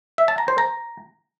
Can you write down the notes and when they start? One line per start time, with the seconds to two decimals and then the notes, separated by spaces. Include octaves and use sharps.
0.18 E5
0.28 A5
0.38 A#5
0.48 C5
0.58 A#5